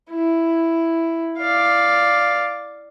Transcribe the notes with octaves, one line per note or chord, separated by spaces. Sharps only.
E4
D5 F5